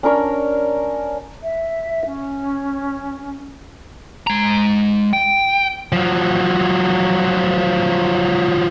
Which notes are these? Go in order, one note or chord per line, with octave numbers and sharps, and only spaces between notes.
C#4 D4 A#4 C#5
E5
C#4
G#3 A#5
G5
F3 F#3